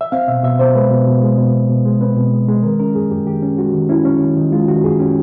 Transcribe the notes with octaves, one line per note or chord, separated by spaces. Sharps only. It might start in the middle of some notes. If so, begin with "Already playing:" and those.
E5
C4 F5
B2 E5
B2 E5
B2 C5
G#3 B4
B2
B2
G#3
B2
B2
B2
G#3
C4 B4
B2
G#3
G#3
D#3 A#4
C#4 A#4
F#2 G#4
F#2 G4
D#3 G4
C#4
G#3 F#4
D#3
C#4 E4
C#4
D#3
D#3
G#3 F4
D#3 F#4
F#2 G#4
C#4 G4